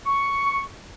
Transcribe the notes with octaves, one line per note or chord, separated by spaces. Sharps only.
C#6